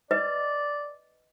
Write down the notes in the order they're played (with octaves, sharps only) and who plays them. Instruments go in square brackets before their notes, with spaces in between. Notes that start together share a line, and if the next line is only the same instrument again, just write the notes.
[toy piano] B4 D#5 [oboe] D5